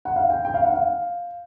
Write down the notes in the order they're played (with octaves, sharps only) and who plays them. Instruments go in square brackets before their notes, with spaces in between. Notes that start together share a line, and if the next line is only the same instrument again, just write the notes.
[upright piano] F#5
F5
G5
G5
F5
F#5
F5